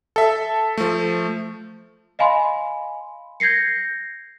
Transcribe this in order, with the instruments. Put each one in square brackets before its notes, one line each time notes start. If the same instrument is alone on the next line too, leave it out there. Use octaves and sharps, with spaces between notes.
[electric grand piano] A4 E5
F3 A3
[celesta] D#5 F5 G#5 B5 C6
G6 G#6 A#6 C7 C#7